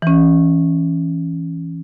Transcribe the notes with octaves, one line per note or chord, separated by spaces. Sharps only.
E3 C#4